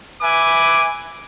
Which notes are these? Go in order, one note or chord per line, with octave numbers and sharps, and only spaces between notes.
B4 E5 G#5 D6